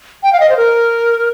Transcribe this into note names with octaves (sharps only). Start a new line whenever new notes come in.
G5
F5
D#5
C5
A#4